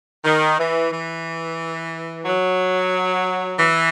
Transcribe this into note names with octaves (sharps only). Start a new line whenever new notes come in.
D#3
E3
E3
F#3
E3